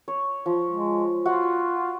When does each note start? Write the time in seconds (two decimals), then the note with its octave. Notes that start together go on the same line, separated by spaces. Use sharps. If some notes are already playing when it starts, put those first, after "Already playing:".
0.08 C#5
0.46 F3
0.70 G#3
1.25 F4 F#4 F#5